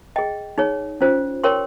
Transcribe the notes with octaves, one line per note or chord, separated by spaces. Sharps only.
G#4 D#5 G5
D#4 G#4 C#5
C#4 F4 C5
G4 A#4 C#5 G5 C6